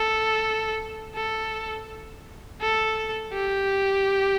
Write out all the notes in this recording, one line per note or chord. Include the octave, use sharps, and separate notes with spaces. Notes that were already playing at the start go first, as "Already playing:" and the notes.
Already playing: A4
A4
A4
G4